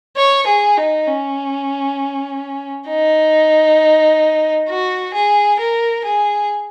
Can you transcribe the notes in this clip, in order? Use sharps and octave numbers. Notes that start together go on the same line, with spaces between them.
C#5
G#4
D#4
C#4
D#4
F#4
G#4
A#4
G#4